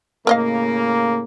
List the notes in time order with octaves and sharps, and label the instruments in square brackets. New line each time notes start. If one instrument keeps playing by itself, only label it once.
[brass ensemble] A2 C#3 A#3 [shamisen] A#4 D#5 F5